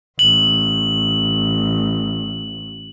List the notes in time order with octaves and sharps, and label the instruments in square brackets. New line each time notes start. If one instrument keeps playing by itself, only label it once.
[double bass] A1 [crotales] F#7